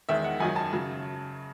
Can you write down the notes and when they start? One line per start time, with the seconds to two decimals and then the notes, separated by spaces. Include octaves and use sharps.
0.09 E2 D#3 G#3 E5
0.24 F#5
0.40 F#2 D#3 F#3 G#5
0.56 A5
0.73 C#3 F#3